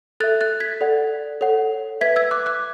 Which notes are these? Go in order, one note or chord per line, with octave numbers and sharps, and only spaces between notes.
A4 E5 F#6 A6
F#6 A6
G#6 B6
A4 D5 F#5
A4 C#5 F#5
B4 E5 G#6 B6
E6 G#6
D6 F#6
D6 F#6